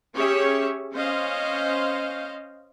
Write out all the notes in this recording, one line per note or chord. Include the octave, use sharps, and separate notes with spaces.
C#4 G4 G#4 C#5 E5
C#4 C5 D#5 F5